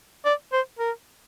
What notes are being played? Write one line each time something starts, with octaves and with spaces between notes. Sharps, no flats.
D5
C5
A#4